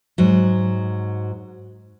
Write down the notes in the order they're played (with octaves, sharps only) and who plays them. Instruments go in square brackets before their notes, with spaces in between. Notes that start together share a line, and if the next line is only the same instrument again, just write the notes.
[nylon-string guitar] G#2 F#3